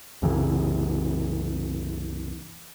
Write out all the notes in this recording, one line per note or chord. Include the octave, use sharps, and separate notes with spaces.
C2 F#2 C#3 E3